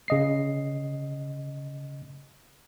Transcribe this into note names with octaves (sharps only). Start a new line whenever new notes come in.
C#3 D#5 C7